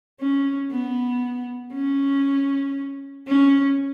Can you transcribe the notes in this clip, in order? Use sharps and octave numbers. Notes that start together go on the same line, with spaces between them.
C#4
B3
C#4
C#4